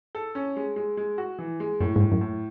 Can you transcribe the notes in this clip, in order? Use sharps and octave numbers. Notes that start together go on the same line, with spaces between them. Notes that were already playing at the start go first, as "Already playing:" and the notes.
A4
C#4
G#3
G#3
G#3
F#4
E3
G#3
F#2 A2
G#2
A2
F#2
A2